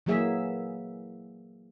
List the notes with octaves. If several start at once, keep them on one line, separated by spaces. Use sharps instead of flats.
E3 F#3 A#3 G#4 E5